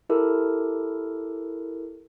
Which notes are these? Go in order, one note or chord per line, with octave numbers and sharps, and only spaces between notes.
E4 G4 A4 A#4